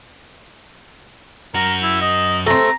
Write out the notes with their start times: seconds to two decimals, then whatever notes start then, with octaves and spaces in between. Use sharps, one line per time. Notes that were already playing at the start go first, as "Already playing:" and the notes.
1.55 F#2 F#4 A#4
1.82 E4
2.01 D#5
2.46 A3 C4 A#5